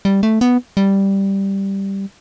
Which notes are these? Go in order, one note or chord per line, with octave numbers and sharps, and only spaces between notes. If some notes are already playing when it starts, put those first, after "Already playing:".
G3
A3
B3
G3